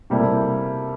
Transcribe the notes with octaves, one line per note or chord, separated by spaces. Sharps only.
C3 G3 A#3 E4 A4